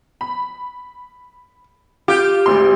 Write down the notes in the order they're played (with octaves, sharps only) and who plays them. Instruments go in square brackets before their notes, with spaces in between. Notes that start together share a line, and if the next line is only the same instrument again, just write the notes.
[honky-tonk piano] B5
[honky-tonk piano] F4 F6 G6 [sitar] G4
[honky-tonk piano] G#1 D2 C6